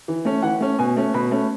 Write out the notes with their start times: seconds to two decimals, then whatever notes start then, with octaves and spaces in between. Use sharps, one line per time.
0.08 E3
0.25 A3 C#4
0.42 E3 F#5
0.60 A3 C#4
0.79 B2 G#5
0.97 A3 C#4
1.14 B2 B5
1.31 A3 C#4